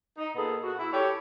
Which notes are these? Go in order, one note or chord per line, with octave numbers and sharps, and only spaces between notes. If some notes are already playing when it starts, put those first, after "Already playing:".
D#4
A#2 B3 G#4 A4
F#4
E4
G4 A4 C#5